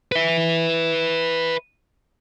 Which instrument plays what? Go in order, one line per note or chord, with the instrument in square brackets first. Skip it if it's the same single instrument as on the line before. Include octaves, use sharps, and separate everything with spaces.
[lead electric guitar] B4 E5